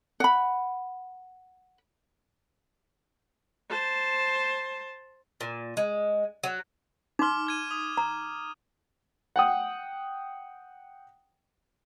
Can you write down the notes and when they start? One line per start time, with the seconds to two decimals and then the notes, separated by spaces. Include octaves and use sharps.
0.20 F#5 B5
3.70 C5 A5
5.41 A#2
5.77 G#3
6.43 F#3
7.19 D#4 C6 D6 F6
7.47 F6 G#6 D#7
7.71 D#6
7.97 A#5
9.36 F#5 G5 D#6